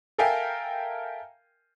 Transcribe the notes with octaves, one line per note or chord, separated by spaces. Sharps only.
A4 A#4 E5 F5 G5 G#5